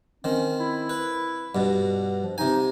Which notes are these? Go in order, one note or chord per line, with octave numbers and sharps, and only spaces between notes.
D#3 C4 C#4
E4
B4
G2 B2
F3
C3 D#4 G#5